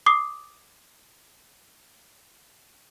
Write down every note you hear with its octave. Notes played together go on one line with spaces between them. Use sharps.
D6 D#6 C7